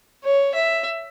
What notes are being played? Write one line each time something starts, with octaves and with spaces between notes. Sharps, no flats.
C#5
E5